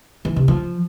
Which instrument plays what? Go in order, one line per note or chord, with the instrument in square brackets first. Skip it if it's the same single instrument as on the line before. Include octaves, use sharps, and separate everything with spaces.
[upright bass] E3
C3
F3